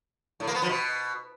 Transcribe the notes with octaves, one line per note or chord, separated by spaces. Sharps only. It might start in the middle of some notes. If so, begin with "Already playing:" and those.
A2
A#3
B3
F3
B2